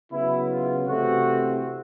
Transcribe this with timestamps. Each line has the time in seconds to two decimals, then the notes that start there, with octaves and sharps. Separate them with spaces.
0.12 C#3 F#3 B3 E4
0.50 F4
0.87 C3 E3 A3 C4 F#4